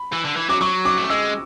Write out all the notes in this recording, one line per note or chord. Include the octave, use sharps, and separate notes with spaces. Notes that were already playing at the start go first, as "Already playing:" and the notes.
Already playing: B5
E3
D3
E3
F#3 D6
F#3 C#6
D6
A3
G#3 E6